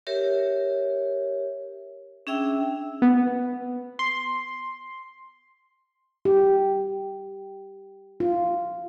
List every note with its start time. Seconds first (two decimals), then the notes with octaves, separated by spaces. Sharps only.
0.07 G4 A#4 C#5 E5
2.27 C#4 D4 G#4 E5 G5 E6
3.02 B3
3.99 C6
6.25 G4
8.20 F4